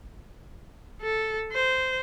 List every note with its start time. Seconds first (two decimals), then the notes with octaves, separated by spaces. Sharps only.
1.02 A4
1.53 C5